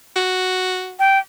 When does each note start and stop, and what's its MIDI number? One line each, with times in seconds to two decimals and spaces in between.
0.16 0.95 66
0.99 1.19 79